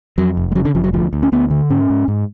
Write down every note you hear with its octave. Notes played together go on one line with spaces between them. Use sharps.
F2 F#3
F1
G#3
C#3 F#3
D3
F1 F3
F#3
D2 F3
D2
C#4
D2 B3
D3
G#2 C#4
G#2
G#2